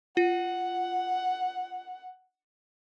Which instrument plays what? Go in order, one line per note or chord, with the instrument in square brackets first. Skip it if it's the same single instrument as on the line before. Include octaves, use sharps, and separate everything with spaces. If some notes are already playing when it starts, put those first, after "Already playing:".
[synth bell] F4 [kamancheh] F#5